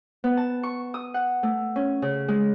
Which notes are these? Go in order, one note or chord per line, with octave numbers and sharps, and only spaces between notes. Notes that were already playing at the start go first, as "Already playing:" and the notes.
B3
A5
C#6
D#6
F#5
A3
C#4
C#3
G#3